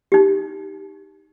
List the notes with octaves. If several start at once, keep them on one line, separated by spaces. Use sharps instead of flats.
D#4 G4